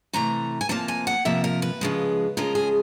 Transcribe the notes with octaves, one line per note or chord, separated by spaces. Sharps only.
C3 E3 A3 A#5
G#5
C3 F3 A#3 A5
G#5
F#5
C3 F3 A#3 E5
A#4
B4
C#3 F3 G#3
C#3 F3 G#3 A#4
G#4